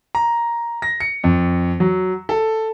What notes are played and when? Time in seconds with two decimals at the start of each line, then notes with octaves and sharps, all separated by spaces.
0.15 A#5
0.82 A#6
1.00 C#7
1.24 F2
1.80 F#3
2.29 A4